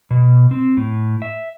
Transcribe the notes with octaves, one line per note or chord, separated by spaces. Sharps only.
B2
C4
A2
E5